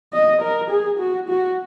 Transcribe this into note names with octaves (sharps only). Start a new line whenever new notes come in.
D#5
A#4
G#4
F#4
F#4